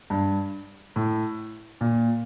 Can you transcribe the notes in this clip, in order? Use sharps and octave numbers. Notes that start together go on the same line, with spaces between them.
G2
A2
A#2